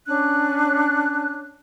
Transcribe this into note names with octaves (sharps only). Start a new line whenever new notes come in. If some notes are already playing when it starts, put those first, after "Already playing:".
C#4 D4 F#6